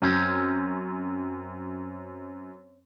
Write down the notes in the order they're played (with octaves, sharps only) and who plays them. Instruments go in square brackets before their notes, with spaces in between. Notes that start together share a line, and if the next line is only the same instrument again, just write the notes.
[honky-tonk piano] F#2 [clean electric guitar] C4 C#4